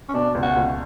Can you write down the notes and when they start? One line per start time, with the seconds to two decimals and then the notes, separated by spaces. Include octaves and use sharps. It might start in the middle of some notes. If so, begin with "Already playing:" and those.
0.09 C#4
0.14 B2 D4
0.35 C#2
0.43 F#4
0.56 C#2